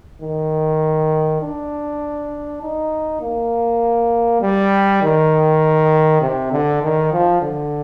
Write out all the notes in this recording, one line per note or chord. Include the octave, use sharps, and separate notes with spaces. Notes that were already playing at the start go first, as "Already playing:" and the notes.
D#3
D4
D#4
A#3
G3
D#3
C3
D3
D#3
F3
D3